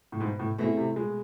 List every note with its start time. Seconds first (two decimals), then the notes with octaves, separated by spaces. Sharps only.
0.12 A2
0.20 G#2 B2
0.39 A2
0.58 B2 A3 C4 E4 G#4
0.77 C3
0.96 B2 G#3